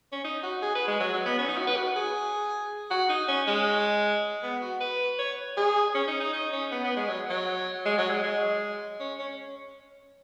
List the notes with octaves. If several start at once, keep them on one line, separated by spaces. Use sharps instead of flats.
C#4
D#4
F#4
G#4
B4
G#3
F#3
F#3
B3
C#4
D#4
F#4
B4
F#4
G#4
F#4
D#4
C#4
G#3
B3
F#4
B4
C#5
G#4
C#4
D#4
D#4
D#4
C#4
B3
B3
G#3
F#3
F#3
G#3
F#3
G#3
G#3
C#4
C#4